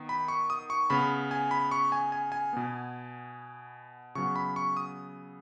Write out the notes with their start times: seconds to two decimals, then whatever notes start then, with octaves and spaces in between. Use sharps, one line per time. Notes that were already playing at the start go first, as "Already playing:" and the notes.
Already playing: D#3 B3
0.09 B5
0.28 C#6
0.50 D#6
0.70 C#6
0.90 C#3 B3 B5
1.31 G#5
1.51 B5
1.71 C#6
1.92 G#5
2.12 G#5
2.32 G#5
2.53 B2 B3
4.15 C#3 F#3 B3 C#6
4.36 B5
4.56 C#6
4.77 D#6